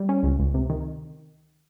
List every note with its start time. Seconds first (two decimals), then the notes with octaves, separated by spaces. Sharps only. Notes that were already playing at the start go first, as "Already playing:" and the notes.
Already playing: G3
0.09 C#4
0.23 C#2
0.39 C#2
0.54 C3
0.70 D#3